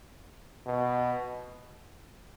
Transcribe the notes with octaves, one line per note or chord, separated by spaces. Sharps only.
B2